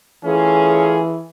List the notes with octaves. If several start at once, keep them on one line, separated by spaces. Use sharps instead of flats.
E3 A3 C#4 F4 G#4